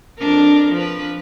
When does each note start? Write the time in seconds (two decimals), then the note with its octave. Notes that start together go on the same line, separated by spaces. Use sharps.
0.19 F2 D4 A#4
0.73 F3 B4